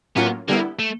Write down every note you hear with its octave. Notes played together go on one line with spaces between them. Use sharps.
A2 F#3 A#3 B3 C#4 F4
D3 G3 A#3 B3 E4
A3